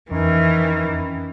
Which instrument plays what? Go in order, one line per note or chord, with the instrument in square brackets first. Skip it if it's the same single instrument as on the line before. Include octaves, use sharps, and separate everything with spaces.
[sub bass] F2 [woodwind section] D#3 C#4 [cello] E3